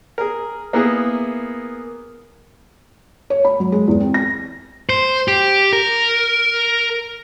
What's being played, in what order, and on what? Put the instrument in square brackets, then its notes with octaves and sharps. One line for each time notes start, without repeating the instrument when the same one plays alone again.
[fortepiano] G#4 A#4
A#3 B3 E4 G#4 A#4
[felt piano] C#5
B5
F#3
G#3
E2
C4
A#6
[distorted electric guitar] C5
G4
A#4